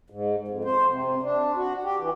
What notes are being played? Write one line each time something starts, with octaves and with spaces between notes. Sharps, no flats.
G#2
F2
C5
C3
D4
F#4
G4
E3